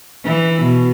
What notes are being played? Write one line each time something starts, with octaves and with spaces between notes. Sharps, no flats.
E3
B2